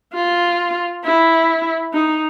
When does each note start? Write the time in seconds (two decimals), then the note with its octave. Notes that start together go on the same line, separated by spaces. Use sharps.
0.15 F4
1.05 E4
1.94 D#4